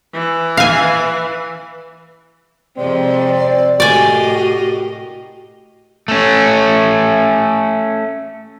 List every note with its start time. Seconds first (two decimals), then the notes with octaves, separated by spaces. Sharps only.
0.14 E3
0.57 F5 G#5
2.77 F2 C3 G#3 C4 D5
3.80 A2 F#4 G4 A#4 D5 D#5 G#5
6.08 A3 C#4